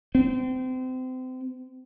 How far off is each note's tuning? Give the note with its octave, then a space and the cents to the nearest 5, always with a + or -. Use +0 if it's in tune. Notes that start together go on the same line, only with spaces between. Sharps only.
C4 -30